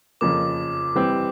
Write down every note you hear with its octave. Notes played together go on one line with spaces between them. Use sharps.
F2 C#3 F3 A#3 D6
E3 G3 C4